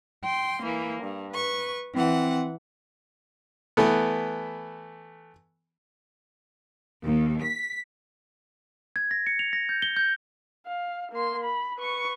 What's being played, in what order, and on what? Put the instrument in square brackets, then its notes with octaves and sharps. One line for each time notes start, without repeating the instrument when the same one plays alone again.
[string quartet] G5 C6
E3 A#3
G2
B4 C#6
[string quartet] E3 F#5 [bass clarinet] C4
[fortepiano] E3 A3 B3
[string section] D#2
B6
[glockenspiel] G#6
A#6
C#7
F7
A#6
G6
G7
G6
[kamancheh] F5
A#3 C6
B5
B4 C#6